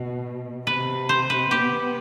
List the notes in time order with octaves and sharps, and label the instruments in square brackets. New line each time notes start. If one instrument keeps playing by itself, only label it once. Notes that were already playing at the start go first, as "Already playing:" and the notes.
Already playing: [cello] B2
[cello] C3 [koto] B4
[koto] C5
B4
[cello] B3 [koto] G4